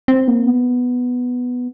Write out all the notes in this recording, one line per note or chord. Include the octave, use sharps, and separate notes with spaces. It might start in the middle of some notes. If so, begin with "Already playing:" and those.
C4
A#3
B3